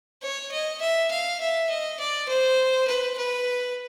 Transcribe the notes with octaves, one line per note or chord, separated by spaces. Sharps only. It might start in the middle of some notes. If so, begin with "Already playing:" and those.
C#5
D#5
E5
F5
E5
D#5
D5
C5
B4
B4